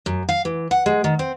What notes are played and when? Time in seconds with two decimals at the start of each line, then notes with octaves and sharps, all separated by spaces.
0.06 F#2
0.29 F5
0.45 E3
0.71 F#5
0.86 G#3
1.04 D#3
1.19 C4